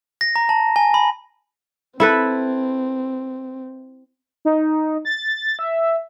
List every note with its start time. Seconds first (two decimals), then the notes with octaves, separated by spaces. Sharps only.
0.21 A#6
0.36 A#5
0.49 A5
0.76 G#5
0.94 B5
2.00 C4 E4 A4 B4
4.45 D#4
5.05 A6
5.59 E5